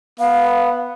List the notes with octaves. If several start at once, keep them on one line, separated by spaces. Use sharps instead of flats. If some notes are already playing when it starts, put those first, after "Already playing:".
B3 F5